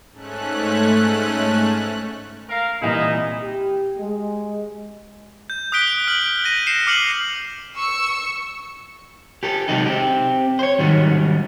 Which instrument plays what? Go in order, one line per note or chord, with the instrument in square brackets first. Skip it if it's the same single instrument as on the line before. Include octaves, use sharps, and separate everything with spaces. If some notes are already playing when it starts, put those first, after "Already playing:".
[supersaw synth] G#2 A3 C#4 F#6
[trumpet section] A#4 F5
[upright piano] C2 A#2 E3 [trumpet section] D#4 E4 D#5
[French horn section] G4
G#3
[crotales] G6
D#6 F#6 B6 D7 G7
F6 D7 F#7
G6 A#6 D#7
C7 C#7 E7
D6 F6 C#7 F#7
[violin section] C#6 E6 C#7
[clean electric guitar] G4 A4
C3 F#3 G#3 D#4 A4
C4 G4
C5 C#5
G#2 D#3 F#3 G3